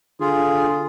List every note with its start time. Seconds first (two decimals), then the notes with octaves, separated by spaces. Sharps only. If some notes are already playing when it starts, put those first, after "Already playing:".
0.20 D3 F4 G#4